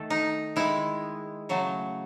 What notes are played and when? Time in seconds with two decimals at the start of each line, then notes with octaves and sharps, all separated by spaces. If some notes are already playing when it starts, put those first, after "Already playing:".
Already playing: D#3 A3 A4
0.10 D#4
0.56 D#3 G#3 E4
1.49 C#3 F#3 A3